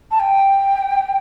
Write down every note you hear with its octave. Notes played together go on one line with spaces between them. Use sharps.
A5
G5